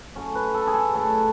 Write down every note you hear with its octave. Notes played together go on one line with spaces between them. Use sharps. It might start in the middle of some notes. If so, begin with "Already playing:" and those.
A2 F#3 A3 C#4
B4
A4
G#4
A4
A2 F#3 A3 C#4 A4